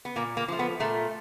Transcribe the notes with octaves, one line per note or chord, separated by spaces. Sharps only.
B3
A#2 A#3
A#3
F3 A3
B3
A#2 A3